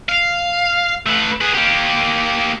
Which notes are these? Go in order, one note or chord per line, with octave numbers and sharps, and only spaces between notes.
F5
A3 B4
G#4 B4
A#3 G4